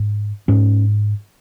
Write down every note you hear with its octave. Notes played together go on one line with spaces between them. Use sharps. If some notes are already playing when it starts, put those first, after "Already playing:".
Already playing: G#2
G#2 C#4